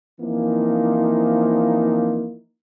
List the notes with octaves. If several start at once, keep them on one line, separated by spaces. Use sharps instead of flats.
E3 F3 A#3 C4 D#4 E4